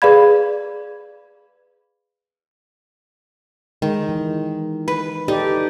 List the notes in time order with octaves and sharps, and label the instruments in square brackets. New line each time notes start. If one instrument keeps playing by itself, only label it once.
[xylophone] G#4 B4 D5 F5 B5 G#6
[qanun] D#3 [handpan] G#3
[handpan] E3
[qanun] B4
[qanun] D#4 [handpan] G4 A4 D5